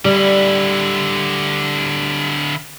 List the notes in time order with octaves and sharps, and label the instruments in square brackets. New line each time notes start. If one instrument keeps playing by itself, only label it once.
[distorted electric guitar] D3 E4 [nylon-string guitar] G3